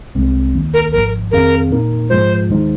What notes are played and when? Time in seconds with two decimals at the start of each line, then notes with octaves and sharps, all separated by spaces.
0.15 C2 C3 G#3 C4
0.54 D#2 D#3 A#3
0.74 A#4
0.92 G#1 G#2 F3 A#4
1.31 F2 D#3 C4 G#4 A#4 F5
1.70 A#2 A#3 D#4 A#4
2.10 G#2 F3 G#3 F4 C5
2.49 D#2 D#3 G#3 D#4 C5